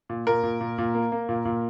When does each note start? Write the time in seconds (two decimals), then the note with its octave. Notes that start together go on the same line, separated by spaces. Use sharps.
0.09 A#2
0.27 A#2 A#4
0.43 A#2
0.61 A#2
0.78 A#2
0.95 A#3
1.12 A#3
1.29 A#2
1.45 A#2